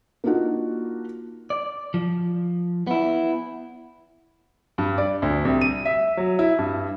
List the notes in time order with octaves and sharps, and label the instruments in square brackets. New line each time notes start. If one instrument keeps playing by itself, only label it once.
[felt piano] A#3 D4 D#4 F4 F#4
[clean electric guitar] D5
F3
B3 E4
[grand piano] G2
D5
D2
C2
D#7
E5
F#3
E4
G2